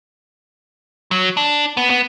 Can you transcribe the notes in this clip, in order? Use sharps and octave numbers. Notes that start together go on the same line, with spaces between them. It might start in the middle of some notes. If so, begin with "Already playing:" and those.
F#3
D4
B3
B3